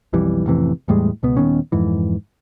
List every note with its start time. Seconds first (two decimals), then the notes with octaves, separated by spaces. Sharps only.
0.13 B1 F2 E3 G3
0.46 A1 F2 C3 E3
0.88 E2 A2 G3 G#3
1.23 C#2 B2 B3
1.37 D#1 D#3 B3 C#4
1.72 F2 G#2 E3